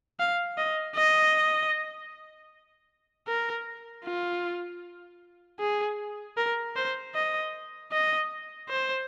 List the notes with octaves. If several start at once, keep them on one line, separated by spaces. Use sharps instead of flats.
F5
D#5
D#5
A#4
F4
G#4
A#4
C5
D#5
D#5
C5